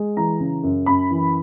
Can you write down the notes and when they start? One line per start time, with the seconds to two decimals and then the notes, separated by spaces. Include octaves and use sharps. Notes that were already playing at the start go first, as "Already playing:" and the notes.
Already playing: G#3
0.17 E3 A#5
0.40 C#3
0.63 F#2
0.86 F#2 B5
1.11 E3